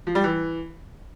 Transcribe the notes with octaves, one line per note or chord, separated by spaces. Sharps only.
F3
G3
E3